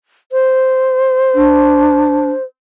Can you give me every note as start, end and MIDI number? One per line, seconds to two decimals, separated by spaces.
0.32 2.43 72
1.35 2.30 62